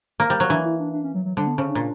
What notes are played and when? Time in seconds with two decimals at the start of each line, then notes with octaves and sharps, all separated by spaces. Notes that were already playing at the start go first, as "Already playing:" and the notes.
0.20 A#3
0.30 G3
0.40 F#3
0.50 E3 D4
0.65 E4
0.79 D4
0.93 D4
1.04 C#4
1.15 F#3
1.25 F#3
1.37 D3 G3
1.47 B3
1.58 C#3 C#4
1.69 D4
1.75 A#2